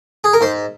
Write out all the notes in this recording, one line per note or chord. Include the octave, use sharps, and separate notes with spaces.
G#4
A#4
G#2 C5